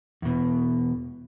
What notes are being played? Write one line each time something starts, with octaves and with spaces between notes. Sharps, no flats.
E2 B2